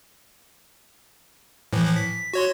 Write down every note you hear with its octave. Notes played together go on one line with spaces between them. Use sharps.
A2 E3 F3
B6
F#4 C#5 C6